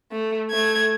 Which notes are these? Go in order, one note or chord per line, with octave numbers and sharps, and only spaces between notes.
A3
A3 G#6